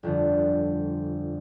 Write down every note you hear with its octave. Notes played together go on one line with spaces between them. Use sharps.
G1 F2 D3